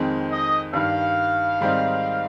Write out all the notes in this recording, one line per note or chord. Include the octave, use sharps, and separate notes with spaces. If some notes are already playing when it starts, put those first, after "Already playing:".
Already playing: F2 D#3 G#3 C4
D#5
G2 D#3 G3 F5
G#2 D#3 G3 C4 D#4